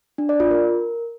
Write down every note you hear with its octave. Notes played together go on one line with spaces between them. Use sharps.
D4
D5
F4
A#4